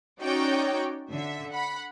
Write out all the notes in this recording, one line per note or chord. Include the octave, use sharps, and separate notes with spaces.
C#4 D#4 F#4 C#5 D5 G5
D3 E5
F#5 B5